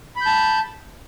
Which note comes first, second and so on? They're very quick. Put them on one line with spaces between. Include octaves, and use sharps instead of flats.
B5 G6 A5